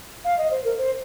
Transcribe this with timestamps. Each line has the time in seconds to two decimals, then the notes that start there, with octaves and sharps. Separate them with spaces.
0.25 F5
0.38 D#5
0.51 C5
0.64 A#4
0.78 C5